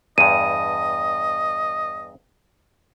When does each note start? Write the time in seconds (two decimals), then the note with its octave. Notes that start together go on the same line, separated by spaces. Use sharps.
0.18 E2 G2 D#5 D#7